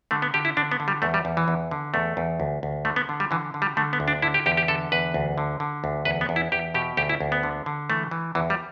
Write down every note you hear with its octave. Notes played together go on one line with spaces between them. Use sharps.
D3 A3
B3
D3 G4
E4
D3 D4
B3
D3
G3
E2 A3
G3
E2
E3
E2
D3
E2 A3
E2
D2
D2
D3 A3
B3
D3
G3
D3 E3
D3
G3
D3 A3
B3
D2
D4
D3 E4
G4
E2 G4
G4
D3 A4
E2 B4
D2
D3
D3
D2
E2 B4
B3
E2
E4
E2 G4
B2 G4
D2 G4
E4
D2
B3
D3
D3
E3 A3
E3
E2 E3
G3